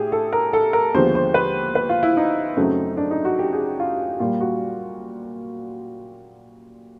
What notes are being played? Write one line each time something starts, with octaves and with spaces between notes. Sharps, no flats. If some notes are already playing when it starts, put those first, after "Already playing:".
Already playing: A2 G4 G#4
A4
A#4
A4
A#4
D#2 D3 F3 G#3 B3 C5
C5
B4
B4
F4
E4
D#4
F#2 C#3 F#3 A3 C4
D4
D#4
F#4
G4
G#4
F4
A#2 G3 A#3 F4
F#4